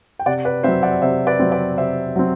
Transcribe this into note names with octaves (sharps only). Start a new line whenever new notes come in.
G5
C3 D5 F#5
B4 D5
F#3 C4 C5 E5
D5 F#5
C3 C5 E5
B4 D5
F#3 C4
B4 D5
C3 C5 E5
F#3 C4